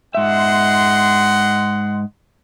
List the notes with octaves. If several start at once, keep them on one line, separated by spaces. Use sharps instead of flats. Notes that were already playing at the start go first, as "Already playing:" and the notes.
G#2 D#5 E5 F#5 C6